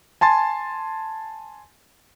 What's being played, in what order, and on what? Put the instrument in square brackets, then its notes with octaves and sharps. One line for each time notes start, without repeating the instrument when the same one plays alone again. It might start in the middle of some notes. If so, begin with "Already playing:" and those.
[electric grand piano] G#5 A5 C6 A6